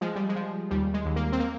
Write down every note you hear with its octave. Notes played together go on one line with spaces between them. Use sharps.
F3 G#3
G3
G#3
F3
D#2 G3
G#3
D#2
A#3
C4
A#3